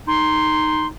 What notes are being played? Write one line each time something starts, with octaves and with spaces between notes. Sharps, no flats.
D#4 C6